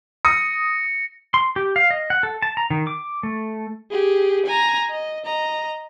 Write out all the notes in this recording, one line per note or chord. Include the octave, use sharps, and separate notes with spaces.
D#6 A#6 C#7
C6
G4
F5
D#5
F#5
A4
A5
A#5
D#3
D6
A3
G4 G#4
G#5 A#5
D#5
D#5 A#5